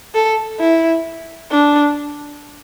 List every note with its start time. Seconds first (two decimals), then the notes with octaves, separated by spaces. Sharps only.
0.14 A4
0.60 E4
1.51 D4